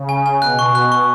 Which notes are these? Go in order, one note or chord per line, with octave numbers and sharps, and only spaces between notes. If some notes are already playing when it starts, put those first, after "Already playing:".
Already playing: C#3
G#5
G#5
B2 F#6
C#6
F#6
C#6